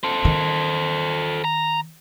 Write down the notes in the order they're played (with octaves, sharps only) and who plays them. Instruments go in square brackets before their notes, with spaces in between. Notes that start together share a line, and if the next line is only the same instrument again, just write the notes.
[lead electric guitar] A4 C5
[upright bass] D#3
[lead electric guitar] A#5